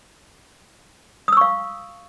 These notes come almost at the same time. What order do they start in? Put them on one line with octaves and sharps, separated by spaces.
D#6 E6 C#6 F5